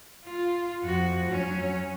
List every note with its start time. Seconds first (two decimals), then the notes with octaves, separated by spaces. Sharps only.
0.24 F4
0.82 F2 F#4
1.30 F#3 C#4